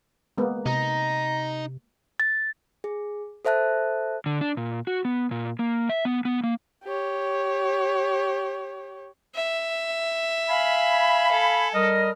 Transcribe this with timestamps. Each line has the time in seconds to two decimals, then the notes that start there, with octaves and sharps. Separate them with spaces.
0.38 G#3 A#3 B3
0.66 C3 D#4 A#5
2.20 A6
2.84 G#4
3.45 A4 C5 E5 A5 F#6
4.26 D3
4.41 D4
4.57 A#2
4.87 F#4
5.05 B3
5.31 A#2
5.59 A#3
5.89 E5
6.05 B3
6.25 B3
6.44 A#3
6.84 G4 C#5
9.35 E5
10.50 F5 G#5 B5
11.31 A4
11.74 G3 A#4 D#5